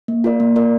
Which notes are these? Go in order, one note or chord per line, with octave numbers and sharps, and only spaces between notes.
A#3
F4 A#4 D5
A#3
F4 A#4 D5